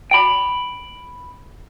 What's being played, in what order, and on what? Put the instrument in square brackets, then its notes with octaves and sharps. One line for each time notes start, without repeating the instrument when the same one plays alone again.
[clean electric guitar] G5 B5